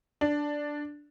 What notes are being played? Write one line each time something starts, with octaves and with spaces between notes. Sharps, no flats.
D4